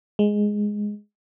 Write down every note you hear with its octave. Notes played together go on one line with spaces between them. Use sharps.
G#3